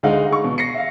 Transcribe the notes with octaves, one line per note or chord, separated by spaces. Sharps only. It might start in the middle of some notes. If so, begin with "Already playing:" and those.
D2 G#3 D#4 F5 F#5
G#4 C#6
B2
A#6 C7 C#7
E5 F5